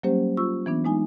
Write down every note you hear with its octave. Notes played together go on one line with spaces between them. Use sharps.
F#3 G3 A#3 C#4 G4 C5
F4 C#6 E6
E3 B3 D4
G#3 D#4 G#5